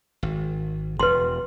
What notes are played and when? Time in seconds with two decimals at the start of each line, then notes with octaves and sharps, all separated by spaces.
0.23 G#1
1.00 E1 B4 C6